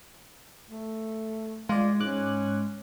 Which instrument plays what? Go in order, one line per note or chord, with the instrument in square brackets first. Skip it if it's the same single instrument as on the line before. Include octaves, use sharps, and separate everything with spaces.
[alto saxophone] A3
[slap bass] G#3 [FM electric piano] F4 D5
[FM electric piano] G#2 D6 F#6 [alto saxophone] C#4